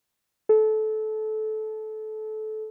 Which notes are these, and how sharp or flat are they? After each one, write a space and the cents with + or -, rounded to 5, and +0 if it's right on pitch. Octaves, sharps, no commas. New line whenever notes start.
A4 -25